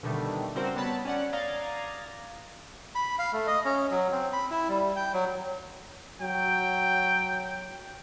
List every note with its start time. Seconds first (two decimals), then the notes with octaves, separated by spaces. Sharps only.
0.03 B2 D3 D#3 G3 A3
0.55 C#3 G3 C4 F#4 A#4 C5
0.76 G3 B3 C#5 A5 B5
1.05 C#4 D5 F#5
1.33 D5 D#5 F5 A#5 G#6 A6
2.95 B5
3.19 F5
3.33 A3
3.47 D#5
3.65 C#4
3.91 F#3
4.12 C4
4.33 B5
4.51 E4
4.69 G3
4.96 G5
5.13 F#3
6.21 F#3 G5